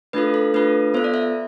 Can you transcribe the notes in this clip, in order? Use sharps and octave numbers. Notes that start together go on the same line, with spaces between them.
A3 D4 F4 A4 B4
A4
A3 D4 F4 A4 B4
B3 F4 A4 C5
D5
E5